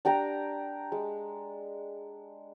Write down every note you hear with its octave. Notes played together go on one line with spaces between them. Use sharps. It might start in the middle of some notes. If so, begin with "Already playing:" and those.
D4 G4 G5 A#5
G#3